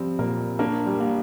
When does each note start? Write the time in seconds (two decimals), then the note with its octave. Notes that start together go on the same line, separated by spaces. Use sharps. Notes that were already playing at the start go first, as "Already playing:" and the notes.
Already playing: F3 G3 C4
0.19 A#2 A#3
0.59 A#3 D4
0.86 G3
1.00 A#3